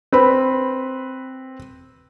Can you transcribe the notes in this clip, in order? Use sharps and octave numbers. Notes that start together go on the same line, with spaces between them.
C4 B4 B5